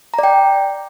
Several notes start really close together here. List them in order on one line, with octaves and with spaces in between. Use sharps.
A#5 D5 G5